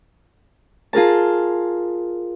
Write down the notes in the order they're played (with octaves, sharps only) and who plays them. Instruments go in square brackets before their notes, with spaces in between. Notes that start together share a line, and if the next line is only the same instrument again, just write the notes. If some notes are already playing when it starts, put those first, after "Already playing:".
[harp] F4 G#4 A#4 A5